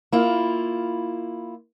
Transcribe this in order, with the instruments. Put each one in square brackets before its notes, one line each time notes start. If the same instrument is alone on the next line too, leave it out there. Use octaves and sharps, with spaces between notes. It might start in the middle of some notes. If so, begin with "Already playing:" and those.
[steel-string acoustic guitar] A#3 E4 F4